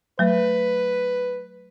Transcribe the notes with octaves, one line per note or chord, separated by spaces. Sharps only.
F#3 A3 B4